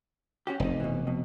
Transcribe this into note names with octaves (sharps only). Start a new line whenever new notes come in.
C#4 F#4 G4
F1 C3 D#4
B2 E3
F2 B2